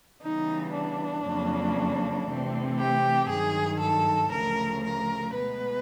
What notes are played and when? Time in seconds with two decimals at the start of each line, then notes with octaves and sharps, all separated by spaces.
0.23 C#3 E3 G3 B3 D#4
0.75 D4
1.25 F2 C#3 F#3 A#3 C#4
2.28 C3 E3 A3 C4
2.80 G4
3.30 G2 D#3 F#3 G#4
3.82 A4
4.33 D2 C#3 F3 A3 A#4
4.84 A#4
5.35 B2 G#3 B3 B4